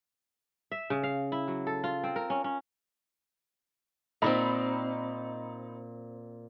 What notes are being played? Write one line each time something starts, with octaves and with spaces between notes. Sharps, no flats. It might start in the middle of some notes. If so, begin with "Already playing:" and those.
E5
C#3
F5
E4
F#3
A4
F4
C4
A#4
C#4
C#4
A#2 A#3 C4 D#4 B5